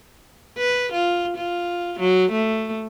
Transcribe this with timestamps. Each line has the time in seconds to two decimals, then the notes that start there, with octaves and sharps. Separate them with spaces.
0.58 B4
0.93 F4
1.37 F4
2.00 F#3
2.32 A3